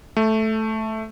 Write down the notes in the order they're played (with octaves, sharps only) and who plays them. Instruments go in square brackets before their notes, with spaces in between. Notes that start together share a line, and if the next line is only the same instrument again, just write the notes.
[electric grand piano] A3